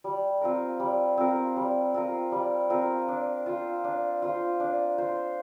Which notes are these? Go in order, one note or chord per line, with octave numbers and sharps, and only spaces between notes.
G3
C4 F4 A#4
G3
C4 F4 A#4
G3
C4 F4 A#4
G3
C4 F4 A#4
D4
F4 C5
D4
F4 C5
D4
F4 C5